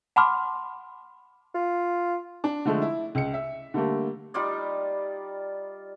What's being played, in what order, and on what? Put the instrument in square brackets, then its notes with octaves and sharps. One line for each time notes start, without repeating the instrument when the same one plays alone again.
[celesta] F#5 A5 B5 C6 D6 F6
[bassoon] F4
[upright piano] D4
D3 F3 G#3 A3
E4
C#2 C#7
E5
D3 G3 A3 A#3
[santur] G3 D#4 F4 D5